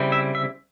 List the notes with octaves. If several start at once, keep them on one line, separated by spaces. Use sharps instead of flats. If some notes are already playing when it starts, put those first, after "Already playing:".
Already playing: C#3 G3 C4 E4
E5
E5